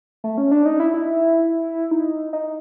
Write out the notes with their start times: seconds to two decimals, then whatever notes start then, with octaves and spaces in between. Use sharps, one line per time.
0.24 A3
0.38 C#4
0.51 D4
0.66 D#4
0.80 E4
0.94 E4
1.91 D#4
2.33 D#4